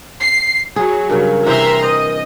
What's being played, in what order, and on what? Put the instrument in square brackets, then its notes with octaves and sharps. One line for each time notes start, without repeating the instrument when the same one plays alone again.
[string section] C7
[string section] F#3 [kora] G#4
[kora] G2 C#3 [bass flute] A#4
[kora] C3 E3 C4 [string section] E5 A#5 C6
[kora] C5 [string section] D#5